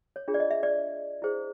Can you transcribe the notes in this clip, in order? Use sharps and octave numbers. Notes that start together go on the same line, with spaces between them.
C#5
D4 F4 G#4 C#5
D5
D#5
E5
D5
E4 G#4 C5